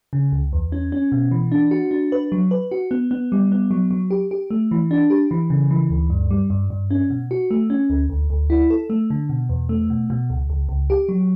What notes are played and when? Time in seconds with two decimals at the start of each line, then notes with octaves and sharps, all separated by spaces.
0.13 C#3
0.32 C#2
0.53 E2
0.72 C#4
0.92 C#4
1.12 B2
1.31 E3
1.52 D4
1.71 F#4
1.91 D4
2.12 B4
2.32 F#3
2.51 B4
2.71 F#4
2.91 B3
3.11 B3
3.32 G3
3.52 B3
3.71 F#3
3.91 F#3
4.11 G4
4.31 G4
4.50 A3
4.71 E3
4.91 D4
5.10 G4
5.31 E3
5.50 C#3
5.71 E3
5.90 D2
6.10 G2
6.30 G3
6.50 G2
6.70 G2
6.91 C#4
7.10 B2
7.31 F#4
7.51 A3
7.70 C#4
7.90 D2
8.10 D2
8.30 D2
8.50 E4
8.70 A4
8.90 A3
9.10 D3
9.29 B2
9.49 E2
9.69 A3
9.90 B2
10.10 B2
10.30 C#2
10.50 C#2
10.69 C#2
10.90 G4
11.09 F#3